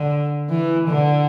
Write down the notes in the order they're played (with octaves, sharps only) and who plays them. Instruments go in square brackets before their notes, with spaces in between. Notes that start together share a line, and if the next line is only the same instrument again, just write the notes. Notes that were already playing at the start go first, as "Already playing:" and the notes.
Already playing: [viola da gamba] D3
E3
D3